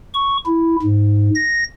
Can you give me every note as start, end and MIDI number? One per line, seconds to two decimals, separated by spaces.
0.14 0.37 85
0.46 0.76 64
0.83 1.30 44
1.35 1.64 94